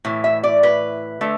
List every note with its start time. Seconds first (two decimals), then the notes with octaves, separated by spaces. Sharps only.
0.05 A2 E3
0.24 E5
0.44 D5
0.63 B4
1.21 D3 A3